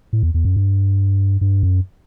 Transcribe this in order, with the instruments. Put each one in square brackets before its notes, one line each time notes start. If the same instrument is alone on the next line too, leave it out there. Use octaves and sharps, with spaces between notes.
[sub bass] A2
E2
E2
F#2
G2
G2
F#2